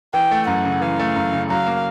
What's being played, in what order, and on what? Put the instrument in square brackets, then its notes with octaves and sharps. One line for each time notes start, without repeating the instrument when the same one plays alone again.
[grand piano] E3 [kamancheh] G5
[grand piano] A3
[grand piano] F#2 [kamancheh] F#5
[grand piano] C#3
[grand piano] E3 [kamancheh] F5
[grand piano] A3
F#2
C#3
[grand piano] F#3 [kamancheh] F5
[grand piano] A#3